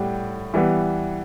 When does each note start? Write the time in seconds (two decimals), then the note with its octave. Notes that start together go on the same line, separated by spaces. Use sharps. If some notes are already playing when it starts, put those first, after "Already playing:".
Already playing: A2 G3 B3 G4
0.54 E3 G3 B3